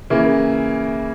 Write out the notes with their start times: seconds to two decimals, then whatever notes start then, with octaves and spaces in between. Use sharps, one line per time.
0.10 C#3 E3 A#3 E4